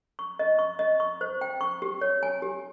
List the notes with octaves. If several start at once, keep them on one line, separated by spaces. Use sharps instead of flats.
C#6
D#5
C#6
D#5
C#6
C5
G5
C#6
G4
C#5
G#5
G4